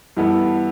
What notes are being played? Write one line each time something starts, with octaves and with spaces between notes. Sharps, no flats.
G2 E3 B3 E4 A4